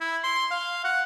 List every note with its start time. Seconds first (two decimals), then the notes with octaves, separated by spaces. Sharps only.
0.01 E4
0.24 C6
0.51 F5
0.84 F#5